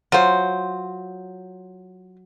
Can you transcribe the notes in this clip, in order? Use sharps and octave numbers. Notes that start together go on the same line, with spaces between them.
F#3 F4 C5